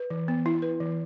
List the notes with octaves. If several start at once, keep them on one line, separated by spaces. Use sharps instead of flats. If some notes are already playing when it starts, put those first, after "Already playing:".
Already playing: B4
E3
B3
E4
B4
E3